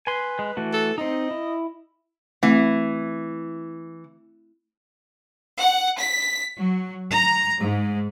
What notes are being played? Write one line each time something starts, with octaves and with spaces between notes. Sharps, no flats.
B4 G#5 C6
G#3
E3 A3 F#4
A4
C4 D#4 D#5
E4
E3 A3 C4
F#5
B6
F#3
A#5
G#2